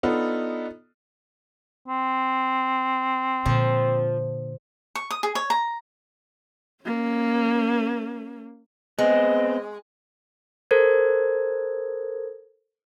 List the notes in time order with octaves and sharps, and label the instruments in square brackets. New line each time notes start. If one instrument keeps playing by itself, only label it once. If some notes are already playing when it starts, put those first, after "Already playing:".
[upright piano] B3 D4 D#4 F4 A4
[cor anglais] C4
[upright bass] A#2 D3 [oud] F3
[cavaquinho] C#6
D#6
G#4
C#5
A#5
[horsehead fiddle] A#3 C#4
[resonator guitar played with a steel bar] G#3 [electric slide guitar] B3 C4 [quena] D#5
[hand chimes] A4 A#4 C5 G#6